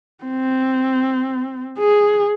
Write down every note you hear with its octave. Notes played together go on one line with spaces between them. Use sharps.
C4
G#4